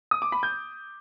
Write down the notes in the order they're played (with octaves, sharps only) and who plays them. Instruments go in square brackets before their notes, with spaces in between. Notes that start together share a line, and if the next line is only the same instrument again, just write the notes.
[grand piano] D#6
D6
B5
G6